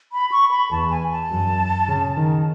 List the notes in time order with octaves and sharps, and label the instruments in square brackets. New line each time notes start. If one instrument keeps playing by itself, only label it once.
[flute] B5
C#6
B5
[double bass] E2 [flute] A5
[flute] G#5
A5
[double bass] F#2
C#3
D#3